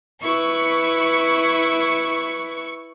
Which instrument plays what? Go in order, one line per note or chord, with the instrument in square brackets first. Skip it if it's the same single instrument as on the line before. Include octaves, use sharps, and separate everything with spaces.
[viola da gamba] E4 B4 [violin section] C#6